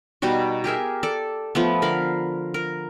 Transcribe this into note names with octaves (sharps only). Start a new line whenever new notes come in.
B2 G3 D#4 F#4
G4 G#4 A#4 E5
A4 D5
F3 A3 B3
D3 A#4 F5 B5
A#4